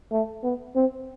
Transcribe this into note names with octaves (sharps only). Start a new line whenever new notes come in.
A3
B3
C4